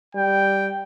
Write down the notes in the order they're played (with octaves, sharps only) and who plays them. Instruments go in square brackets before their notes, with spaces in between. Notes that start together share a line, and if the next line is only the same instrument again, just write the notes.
[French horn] G3 [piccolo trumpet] G5